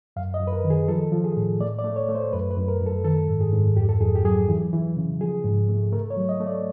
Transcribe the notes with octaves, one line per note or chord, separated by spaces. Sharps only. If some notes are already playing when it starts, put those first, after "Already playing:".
F#2 F5
D#5
F#2
B4
A#4
D#3
G#4
F3 A4
F3
G#4
A2
A3 D5
D5
A3
C#5
A3
C5
F#2 B4
B4
F#2
A#4
F#2
A4
D#3 A4
G#2
G#4
G#2
F2 G4
A4
F2 G#4
G4
F#3 G#4
E3
E3
C#3
F3 G#4
G#2
A3
A3 A#4
C#5
F#3
D#5
A3
D5